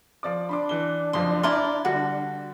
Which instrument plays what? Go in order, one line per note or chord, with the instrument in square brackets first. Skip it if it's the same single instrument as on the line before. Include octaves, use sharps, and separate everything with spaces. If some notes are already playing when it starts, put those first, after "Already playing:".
[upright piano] F3 D5 D6
[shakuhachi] D4 [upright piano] B5 C6 D6
[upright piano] E3 G7
[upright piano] F#1 F2 F3 [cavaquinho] C6
[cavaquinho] E4 D5 C6 [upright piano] A5 A#5 F6
[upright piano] D3 G3 [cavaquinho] F#4